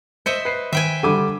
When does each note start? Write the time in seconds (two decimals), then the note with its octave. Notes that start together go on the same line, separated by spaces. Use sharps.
0.26 C5 D#5 E5 C#7
0.45 B4 C7
0.73 D#3 E5 G5 G#5
1.03 D3 G3 D6 D#7